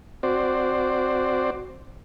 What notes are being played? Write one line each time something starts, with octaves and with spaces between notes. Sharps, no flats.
C4 F#4 C5 D5